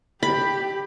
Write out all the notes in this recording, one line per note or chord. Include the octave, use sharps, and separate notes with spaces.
G4 B5